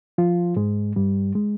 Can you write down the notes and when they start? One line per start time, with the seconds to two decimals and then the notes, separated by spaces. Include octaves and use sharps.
0.18 F3 F4
0.56 G#2 G#3
0.96 G2 G3
1.35 G#3